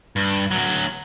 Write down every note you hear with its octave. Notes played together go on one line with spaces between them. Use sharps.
G2
D2 F#3